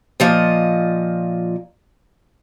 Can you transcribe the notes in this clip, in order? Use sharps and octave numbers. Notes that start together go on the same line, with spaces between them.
A#2 F3 D#5